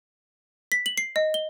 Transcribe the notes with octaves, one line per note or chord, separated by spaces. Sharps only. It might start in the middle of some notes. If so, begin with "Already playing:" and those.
B6
F#7
C7
D#5
G7